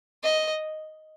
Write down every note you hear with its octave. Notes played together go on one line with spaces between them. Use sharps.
D#5